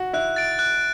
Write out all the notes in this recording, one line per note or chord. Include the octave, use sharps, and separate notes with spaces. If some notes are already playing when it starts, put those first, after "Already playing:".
Already playing: F#4
E4 F#6
A6 D7
F#6